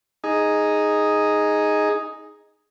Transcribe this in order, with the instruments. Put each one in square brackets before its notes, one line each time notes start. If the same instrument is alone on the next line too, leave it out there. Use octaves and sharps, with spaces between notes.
[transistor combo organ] D#4 G#4